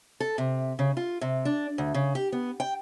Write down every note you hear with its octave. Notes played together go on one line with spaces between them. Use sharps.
A4
C3
C#3
F4
C3
D4
D2
C#3
G4
B3
G5